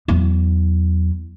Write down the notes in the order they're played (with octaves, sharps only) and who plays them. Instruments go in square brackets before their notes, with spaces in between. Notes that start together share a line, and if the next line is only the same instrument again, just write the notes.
[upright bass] E2 F#3